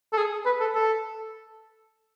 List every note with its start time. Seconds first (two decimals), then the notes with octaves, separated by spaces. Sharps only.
0.13 A4
0.17 G#4
0.46 B4
0.60 A4
0.75 A4